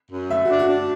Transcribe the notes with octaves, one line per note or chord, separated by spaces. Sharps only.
F#2
A3 E5
D4 F#4
F#4
D4